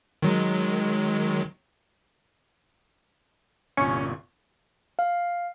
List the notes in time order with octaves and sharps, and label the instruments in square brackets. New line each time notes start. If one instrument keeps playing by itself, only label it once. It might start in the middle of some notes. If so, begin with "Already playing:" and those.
[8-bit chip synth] D#3 F#3 G#3
[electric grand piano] G1 C2 A#2 [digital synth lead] C#4 [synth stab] C#6
[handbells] F5